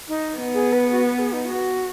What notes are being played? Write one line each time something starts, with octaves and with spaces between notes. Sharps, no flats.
D#4
B3
G#4
B4
F#4
B4
G#4
D#4
F#4